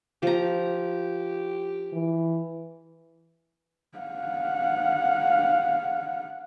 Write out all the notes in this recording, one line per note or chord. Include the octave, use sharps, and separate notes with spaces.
F3 G4 A#5
E3
F5 F#5